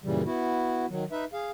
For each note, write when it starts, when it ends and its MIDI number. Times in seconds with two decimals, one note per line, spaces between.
0.04 0.23 42
0.04 0.23 46
0.04 0.23 49
0.04 0.23 52
0.04 0.23 55
0.25 0.86 59
0.25 0.86 64
0.25 0.86 66
0.90 1.04 51
0.90 1.04 54
1.12 1.25 63
1.12 1.25 71
1.12 1.25 76
1.33 1.51 68
1.33 1.51 77